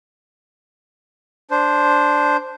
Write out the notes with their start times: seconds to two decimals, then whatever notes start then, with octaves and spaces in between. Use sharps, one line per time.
1.51 D4 C5